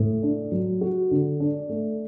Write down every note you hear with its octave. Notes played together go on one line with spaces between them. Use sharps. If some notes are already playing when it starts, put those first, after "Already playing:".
Already playing: A2
D4
F#3
F#4
D3
D4
A3